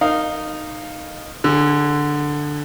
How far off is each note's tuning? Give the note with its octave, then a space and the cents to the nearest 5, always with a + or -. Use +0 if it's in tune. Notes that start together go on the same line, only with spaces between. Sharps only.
D#4 -15 A#4 -15 F5 +0
D3 +5 G#4 -30